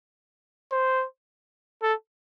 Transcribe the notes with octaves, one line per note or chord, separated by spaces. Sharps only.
C5
A4